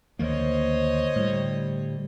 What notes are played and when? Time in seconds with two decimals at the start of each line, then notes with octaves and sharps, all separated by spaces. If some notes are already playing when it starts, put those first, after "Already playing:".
0.19 D2 D#3 A#3 C5 C#5 D#5
1.16 A2 D3 G3